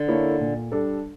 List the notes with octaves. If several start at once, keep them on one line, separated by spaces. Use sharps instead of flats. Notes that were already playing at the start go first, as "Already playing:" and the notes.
Already playing: D3
A#3 E4 A4 C#5
A#2
G3 D4 A4